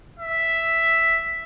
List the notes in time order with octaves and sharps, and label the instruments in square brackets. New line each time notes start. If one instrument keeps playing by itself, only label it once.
[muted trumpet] E5